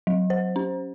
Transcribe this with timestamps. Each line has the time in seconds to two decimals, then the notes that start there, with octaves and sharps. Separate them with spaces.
0.07 F#3
0.30 C5
0.56 C#4